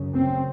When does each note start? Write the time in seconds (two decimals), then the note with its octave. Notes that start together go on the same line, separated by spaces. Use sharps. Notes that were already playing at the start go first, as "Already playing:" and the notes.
Already playing: F#2 C#3
0.13 C4